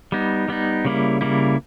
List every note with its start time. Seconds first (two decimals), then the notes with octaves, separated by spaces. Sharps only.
0.12 G3 B3 D#4
0.48 G3 B3 D#4
0.85 C#3 G3 A#3 E4
1.21 C#3 G3 A#3 E4